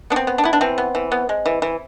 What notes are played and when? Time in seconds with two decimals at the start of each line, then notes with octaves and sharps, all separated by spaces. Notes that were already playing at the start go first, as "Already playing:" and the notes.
0.10 B3 D4
0.16 C4
0.27 B3
0.38 D4
0.44 B3 E4
0.53 D4
0.61 E3 C4
0.78 B3
0.95 E3
1.12 B3
1.29 G#3
1.46 E3
1.62 E3